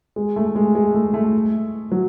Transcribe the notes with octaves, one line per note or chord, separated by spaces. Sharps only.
G#3
A3
G#3
G#3
A3
A3
F#3